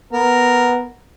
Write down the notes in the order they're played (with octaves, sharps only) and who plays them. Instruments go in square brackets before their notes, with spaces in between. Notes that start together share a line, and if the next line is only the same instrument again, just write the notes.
[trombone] B3 [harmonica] A#4